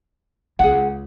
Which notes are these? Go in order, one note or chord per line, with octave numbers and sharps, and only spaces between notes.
C#2 G#4 F#5